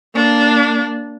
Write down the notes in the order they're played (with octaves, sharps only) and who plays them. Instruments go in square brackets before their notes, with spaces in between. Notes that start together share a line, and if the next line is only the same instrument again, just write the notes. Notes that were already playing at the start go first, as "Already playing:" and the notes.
[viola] A#3 D4